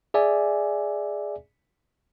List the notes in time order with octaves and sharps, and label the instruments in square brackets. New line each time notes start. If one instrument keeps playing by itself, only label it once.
[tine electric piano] G#4 D5 E5 G#5